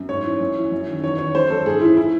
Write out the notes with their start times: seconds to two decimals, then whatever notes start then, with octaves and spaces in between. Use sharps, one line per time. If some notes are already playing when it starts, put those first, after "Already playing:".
Already playing: F#2
0.09 G#2 C#5
0.25 E3
0.41 F#2
0.56 E3
0.72 F#2
0.87 D#3
1.03 E2 C#5
1.19 D#3 C#5
1.35 F#2 C5
1.50 F#2 A4
1.66 G#2 G#4
1.82 E3 E4
1.97 E4